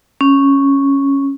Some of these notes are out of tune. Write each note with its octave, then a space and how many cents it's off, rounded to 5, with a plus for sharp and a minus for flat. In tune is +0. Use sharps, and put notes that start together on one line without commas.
C#4 -5